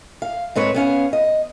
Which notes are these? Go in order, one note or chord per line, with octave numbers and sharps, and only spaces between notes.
F5
G#2 C4 B4 C#5
B3 C#4 F5
D#5